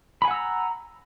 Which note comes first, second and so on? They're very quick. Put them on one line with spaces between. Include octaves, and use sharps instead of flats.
B5 G#5 F#5 E6 A#5